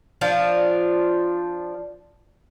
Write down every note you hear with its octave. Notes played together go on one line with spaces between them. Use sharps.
F3 D4 F4